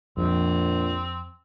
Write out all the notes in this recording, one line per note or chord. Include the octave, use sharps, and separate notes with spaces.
A#1 F2 F3 C4